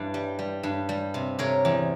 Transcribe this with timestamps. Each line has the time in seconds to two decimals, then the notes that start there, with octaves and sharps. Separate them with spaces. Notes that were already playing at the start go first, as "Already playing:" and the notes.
Already playing: G2 E3
0.14 G3
0.39 G3
0.63 G2
0.89 G3
1.14 C3
1.39 C3 A#4 C#5
1.65 E2